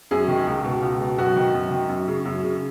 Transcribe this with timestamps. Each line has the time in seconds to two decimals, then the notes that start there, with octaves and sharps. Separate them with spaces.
0.11 F#2 G#4
0.28 D#3
0.47 C#2
0.64 B2
0.82 C#2
1.01 B2
1.18 F#2 F#4
1.36 D#3
1.54 F#2
1.71 D#3
1.89 F#2
2.08 C#3
2.25 F#2
2.43 C#3